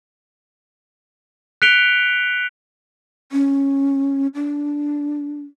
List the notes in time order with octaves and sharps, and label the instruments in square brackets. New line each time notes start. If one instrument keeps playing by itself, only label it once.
[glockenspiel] F#6 B6 C#7 D7 F7 G7
[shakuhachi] C#4
D4